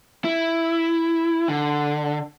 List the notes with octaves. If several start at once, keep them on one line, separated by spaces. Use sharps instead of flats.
E4
D3